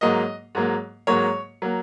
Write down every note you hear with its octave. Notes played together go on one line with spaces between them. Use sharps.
G#2 F#3 A#3 D#5
G#2 F#3 A#3
G#2 F#3 A#3 C#5
F#3 A#3